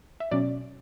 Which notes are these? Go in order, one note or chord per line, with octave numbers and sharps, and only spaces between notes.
E5
B2 F#3 C#4 D5